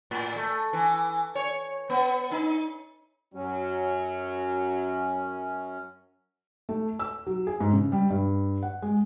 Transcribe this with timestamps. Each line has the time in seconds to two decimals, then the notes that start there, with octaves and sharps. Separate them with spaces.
0.11 A2
0.36 A3
0.73 E3
1.35 C#5
1.90 B3
2.31 D#4
3.34 F#2 F#3 C#4
6.69 A3
7.00 E6
7.27 F#3
7.47 G#4
7.60 G#2
7.73 C#3
7.92 G3
8.10 G2
8.63 F#5
8.82 G#3